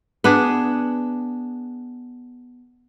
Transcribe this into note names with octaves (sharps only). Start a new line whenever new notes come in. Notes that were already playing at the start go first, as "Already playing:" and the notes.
B3 D4 G#4